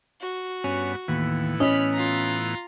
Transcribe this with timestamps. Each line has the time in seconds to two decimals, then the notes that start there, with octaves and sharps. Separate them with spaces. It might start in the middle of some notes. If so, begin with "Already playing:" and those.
0.21 F#4
0.64 G2 B3 C#4 F#5
1.08 D#2 A2 E3 B3
1.60 C#4 D#5 B5 F6
1.93 F4 A#5